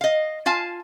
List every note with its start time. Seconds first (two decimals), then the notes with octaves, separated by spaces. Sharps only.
0.01 D#5 F5
0.46 F4 F5 G#5 A5